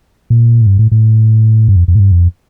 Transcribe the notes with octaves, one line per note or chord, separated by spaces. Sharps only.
A#2
A2
G2
A2
A2
G2
F2
F2
A2
G2
F2